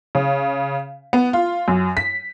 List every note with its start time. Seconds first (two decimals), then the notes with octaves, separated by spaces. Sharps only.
0.15 C#3
1.13 B3
1.33 F4
1.68 F#2
1.97 B6